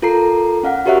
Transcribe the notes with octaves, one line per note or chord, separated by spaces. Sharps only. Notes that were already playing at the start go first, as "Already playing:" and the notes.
F4 A4 A#4 A#5 C7
C#4 F5 F#5
F#4 G4 A#4 C#5 E5 F#5